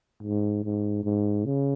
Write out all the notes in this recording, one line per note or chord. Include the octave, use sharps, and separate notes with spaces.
G#2
G#2
G#2
C#3